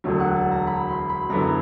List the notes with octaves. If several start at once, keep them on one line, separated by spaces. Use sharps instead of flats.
E1 D2 D3 F#3
F#5
A5
A#5
B5
C6
B5
F#2 D3 F#3 B3 E4 A#5